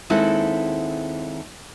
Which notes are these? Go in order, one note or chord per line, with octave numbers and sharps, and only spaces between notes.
D#2 G#3 C4 E4 A4 F#5